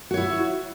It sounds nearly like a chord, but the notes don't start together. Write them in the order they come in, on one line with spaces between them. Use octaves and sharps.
F#4 C#5 E4